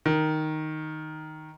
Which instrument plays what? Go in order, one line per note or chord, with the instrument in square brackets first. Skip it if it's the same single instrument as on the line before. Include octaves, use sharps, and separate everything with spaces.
[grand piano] D#3